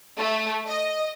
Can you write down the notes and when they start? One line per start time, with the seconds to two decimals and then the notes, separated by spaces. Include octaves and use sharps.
0.17 A3
0.66 D#5